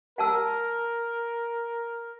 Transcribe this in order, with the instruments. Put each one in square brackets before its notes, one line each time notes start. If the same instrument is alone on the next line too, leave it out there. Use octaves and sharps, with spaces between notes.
[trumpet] A#4 [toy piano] F#5 A5 E6